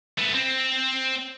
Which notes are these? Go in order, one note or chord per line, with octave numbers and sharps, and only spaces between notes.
A3 B3
C4